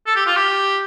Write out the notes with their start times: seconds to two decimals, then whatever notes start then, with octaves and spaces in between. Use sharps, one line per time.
0.06 A4
0.16 G4
0.26 F4
0.36 G4